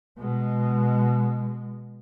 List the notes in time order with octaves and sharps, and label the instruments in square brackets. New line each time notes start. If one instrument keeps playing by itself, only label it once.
[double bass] B2 G#3